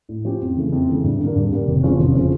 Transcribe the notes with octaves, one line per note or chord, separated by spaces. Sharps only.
A2
F3 C#4 G4
F2
C#3 E3 A3
F2
C#3 E3 A3
G2
D3 G3 A#3
G2
D3 G3 A#3
F1
E2 C#3 F3 C#4
F1
C#3 F3 C#4